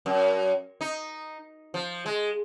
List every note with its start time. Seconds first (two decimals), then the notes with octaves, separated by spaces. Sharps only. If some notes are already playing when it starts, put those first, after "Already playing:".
0.06 F#2
0.81 D#4
1.74 F3
2.06 G#3